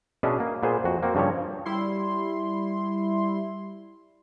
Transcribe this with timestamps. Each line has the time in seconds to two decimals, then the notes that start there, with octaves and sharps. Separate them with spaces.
0.23 B2 C#4 D4 G#4 D#5 E5
0.40 A#3
0.63 A#2 B3 G#4 C5
0.84 F2 F#4
1.03 A#3 C4 F#4
1.15 G2 C#3 F3 G3 C#5
1.66 G3 E4 C6